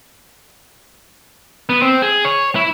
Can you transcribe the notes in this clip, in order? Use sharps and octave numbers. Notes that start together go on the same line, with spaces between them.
B3
C4
G#4
C#5
E4